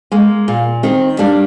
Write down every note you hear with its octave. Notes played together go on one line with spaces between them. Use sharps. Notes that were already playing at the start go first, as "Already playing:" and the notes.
G#3 A#3
A#2
D#3 C4
G3 A#3 D4